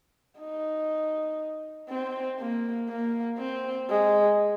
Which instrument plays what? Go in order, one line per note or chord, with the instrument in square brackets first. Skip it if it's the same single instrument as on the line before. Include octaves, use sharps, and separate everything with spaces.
[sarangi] D#4
C4
A#3
A#3
C4
G#3